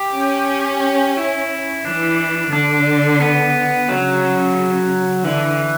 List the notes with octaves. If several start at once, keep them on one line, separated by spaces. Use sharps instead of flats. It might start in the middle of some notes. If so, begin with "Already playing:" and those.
Already playing: G4
C#4
E4
E3 D4
D3 D4
B3
C#3 F#3
D3 E3